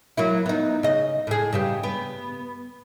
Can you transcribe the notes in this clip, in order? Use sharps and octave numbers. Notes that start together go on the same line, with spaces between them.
F#3 A#3 E4
B3 D#4
C#3 D#5
A2 G#4
G2 C#3 G4
B3